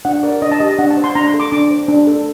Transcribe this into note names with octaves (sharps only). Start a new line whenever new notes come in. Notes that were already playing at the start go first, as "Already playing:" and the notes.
D4 F#5
A#4 D5
D4 D#5
A5
G4 D#5
D4 F#5
A5
C5
C6
D4 A#5
C6
A4
D6
D4 D6
C5
D4
A4